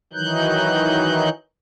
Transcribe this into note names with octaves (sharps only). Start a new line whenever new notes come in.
D#3 E3 F#3 D#4 F#6 G6